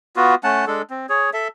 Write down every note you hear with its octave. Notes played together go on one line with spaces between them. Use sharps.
B3 F4 F#4
A3 C#4 F#5 A5
G#3 D4 A4
C4
G#4 C#5
A4 E5